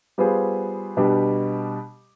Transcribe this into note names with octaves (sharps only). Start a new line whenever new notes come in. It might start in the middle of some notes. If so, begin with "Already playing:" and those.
G3 B3 F4 G#4 C5
B2 G3 D4 G4